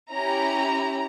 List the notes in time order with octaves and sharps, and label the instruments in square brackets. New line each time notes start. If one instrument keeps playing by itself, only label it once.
[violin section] C#4 E4 G4 A#5